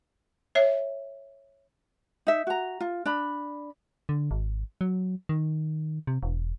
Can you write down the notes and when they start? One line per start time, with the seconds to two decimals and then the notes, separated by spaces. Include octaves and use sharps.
0.55 C#5 E5
2.27 D#4 E5
2.47 F#4 A#5
2.80 F4
3.05 D4 B5
4.09 D3
4.31 G#1
4.81 F#3
5.29 D#3
6.07 C3
6.23 E1